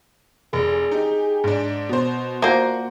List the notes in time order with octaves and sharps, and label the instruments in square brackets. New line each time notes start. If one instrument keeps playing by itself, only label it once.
[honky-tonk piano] F1 [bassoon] G#4
[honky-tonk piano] D#4 G4
G#2 D4
B2 C5
[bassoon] A#2 [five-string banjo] A#3 C5 [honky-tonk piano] F#4